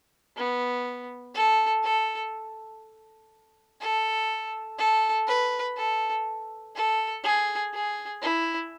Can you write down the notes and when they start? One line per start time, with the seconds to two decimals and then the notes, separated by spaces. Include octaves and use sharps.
0.37 B3
1.34 A4
1.83 A4
3.80 A4
4.78 A4
5.27 B4
5.77 A4
6.75 A4
7.24 G#4
7.73 G#4
8.22 E4